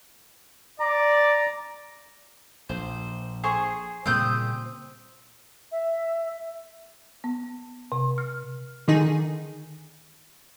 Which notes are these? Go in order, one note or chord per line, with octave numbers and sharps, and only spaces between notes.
D5 A#5
A#1 C5
G#4 C5 C#6
A#2 C#3 G3 C4 D#6 G6
E5
B3
C3
F6
D3 D#3 D#4 G#4